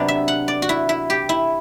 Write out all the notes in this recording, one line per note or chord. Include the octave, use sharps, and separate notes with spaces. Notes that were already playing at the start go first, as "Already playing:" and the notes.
Already playing: C3 F#3 B3 D4 D5
E5
F#5
D5
F#4
E4
E4
G4
E4